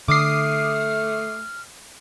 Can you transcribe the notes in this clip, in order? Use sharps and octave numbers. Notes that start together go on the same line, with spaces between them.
D3 A3 D6 D#6 F6 C7